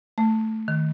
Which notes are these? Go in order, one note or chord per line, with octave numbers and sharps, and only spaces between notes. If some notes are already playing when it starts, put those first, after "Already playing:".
A3
D#3